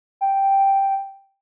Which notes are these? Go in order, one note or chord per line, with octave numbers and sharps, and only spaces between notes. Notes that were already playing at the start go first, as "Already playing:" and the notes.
G5